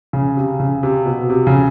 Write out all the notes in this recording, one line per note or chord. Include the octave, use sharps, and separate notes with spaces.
C#3
C3
C#3
C3
B2
C3
C#3